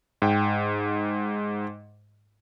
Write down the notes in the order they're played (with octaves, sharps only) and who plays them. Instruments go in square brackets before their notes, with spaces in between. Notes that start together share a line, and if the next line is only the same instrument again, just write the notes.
[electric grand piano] G#2 G5